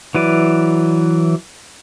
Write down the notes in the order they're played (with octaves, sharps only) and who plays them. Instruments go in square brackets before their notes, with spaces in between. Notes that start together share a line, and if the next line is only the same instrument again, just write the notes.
[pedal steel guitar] E3 F#3 E4 B4 D5